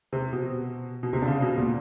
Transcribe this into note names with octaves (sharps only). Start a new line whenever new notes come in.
C3
B2
B2
C3
D3
C#3
B2
A#2